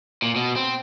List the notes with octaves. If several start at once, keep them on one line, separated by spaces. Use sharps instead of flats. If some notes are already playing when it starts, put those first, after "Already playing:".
A#2
B2
C4